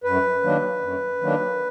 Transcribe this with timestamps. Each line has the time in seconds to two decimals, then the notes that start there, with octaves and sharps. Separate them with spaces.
0.04 F#2 B4
0.43 D#3 F#3 A#3 D4
0.82 F#2
1.21 D#3 F#3 A#3 D4